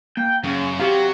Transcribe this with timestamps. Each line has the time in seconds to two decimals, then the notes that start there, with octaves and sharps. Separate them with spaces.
0.17 A#3 G5
0.44 F#2 C#3
0.80 C3 F#3 G4 F5